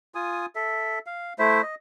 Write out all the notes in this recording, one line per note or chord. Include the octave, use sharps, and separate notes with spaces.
F4 G#5 D#6
A4 E5
F5
A3 E4 C5 E5
D#5